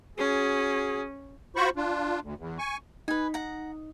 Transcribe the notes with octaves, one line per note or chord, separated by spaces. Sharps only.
C#4 F#4 G#4
F4 F#4 C5 B5 C#6
D4 F4
D2
E2
G#5 C#6
D#4 B4 G#5
F#5 A#5